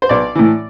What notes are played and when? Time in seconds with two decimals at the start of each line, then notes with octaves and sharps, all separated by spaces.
0.02 C5
0.09 B1 D5
0.35 A2 E3